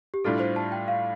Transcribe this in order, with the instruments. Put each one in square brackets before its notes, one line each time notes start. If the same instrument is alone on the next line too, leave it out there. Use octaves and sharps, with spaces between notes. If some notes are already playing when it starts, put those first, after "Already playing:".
[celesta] G4
[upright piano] A2 G3 D4 F4 [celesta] A4
[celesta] C5
A5
G5
F5